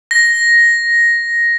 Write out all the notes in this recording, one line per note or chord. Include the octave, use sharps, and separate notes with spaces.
A#6